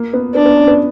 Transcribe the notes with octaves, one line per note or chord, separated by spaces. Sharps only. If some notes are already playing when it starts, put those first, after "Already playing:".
Already playing: A#3
B3
B3 D4
B3
C#4
B3